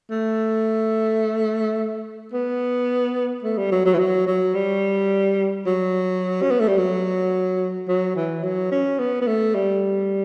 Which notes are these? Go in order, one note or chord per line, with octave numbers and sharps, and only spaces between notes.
A3
B3
A3
G3
F#3
F#3
E3
F#3
F#3
G3
F#3
C#4
B3
A3
G3
F#3
F#3
E3
F#3
C#4
B3
B3
A3
G3